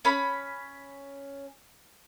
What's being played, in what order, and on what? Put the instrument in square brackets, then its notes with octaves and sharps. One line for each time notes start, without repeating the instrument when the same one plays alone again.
[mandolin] C#4 B5